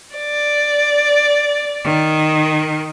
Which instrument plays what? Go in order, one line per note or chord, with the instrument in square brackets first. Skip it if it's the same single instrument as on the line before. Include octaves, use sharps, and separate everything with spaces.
[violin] D5
[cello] D#3